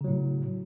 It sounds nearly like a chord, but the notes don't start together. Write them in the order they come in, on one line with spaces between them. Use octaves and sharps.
C#3 F#3 A2